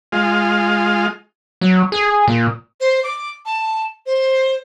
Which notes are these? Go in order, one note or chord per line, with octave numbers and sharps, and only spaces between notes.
G#3 F4
F#3
G#4
A#2
C5
D6
A5
C5